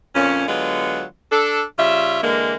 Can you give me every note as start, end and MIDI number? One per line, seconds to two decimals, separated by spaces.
0.15 0.44 41
0.15 0.44 46
0.15 0.44 61
0.47 1.03 50
0.47 1.03 54
0.47 1.03 56
0.47 1.03 59
0.47 1.03 65
1.31 1.62 62
1.31 1.62 69
1.78 2.22 49
1.78 2.22 55
1.78 2.22 65
1.78 2.22 76
2.22 2.54 50
2.22 2.54 52
2.22 2.54 56
2.22 2.54 58